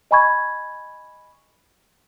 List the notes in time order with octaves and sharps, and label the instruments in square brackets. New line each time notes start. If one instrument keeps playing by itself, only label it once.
[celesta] D#5 G#5 B5 C#6 G#6